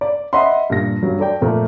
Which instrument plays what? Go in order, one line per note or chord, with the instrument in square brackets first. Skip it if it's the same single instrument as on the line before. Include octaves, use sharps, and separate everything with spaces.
[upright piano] D5
D#5 E5 F#5 B5 C6
G2 A#2 A#6
G2 F#3
A4 D5 G5
F2 A#2 A3 A#3